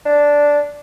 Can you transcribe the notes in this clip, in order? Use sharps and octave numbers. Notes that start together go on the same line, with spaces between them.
D4